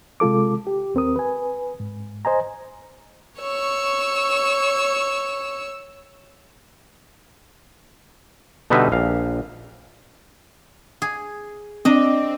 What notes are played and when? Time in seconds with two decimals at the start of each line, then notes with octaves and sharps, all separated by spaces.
0.20 C3 G#3 F4 A4 D6
0.67 G4
0.95 D#2 C4 A#4 D#6
1.16 B4 G#5
1.80 G#2
2.25 C5 D#5 G#5 A#5
3.40 C#5 C#6 E6
8.70 B2 D3 G3 D#4 B4 E5
8.92 A#1 F5
11.02 G#4
11.85 C4 D4 D#5